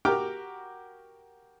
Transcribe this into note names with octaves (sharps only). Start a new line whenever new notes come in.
F#4 G4 A#4 G5 D6 F6